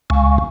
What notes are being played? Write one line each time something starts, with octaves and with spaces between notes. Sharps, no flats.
C#2